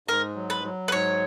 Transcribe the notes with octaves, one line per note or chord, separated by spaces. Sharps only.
G#2 A#4
F#3
B4
F#3
B4
G#2 C#5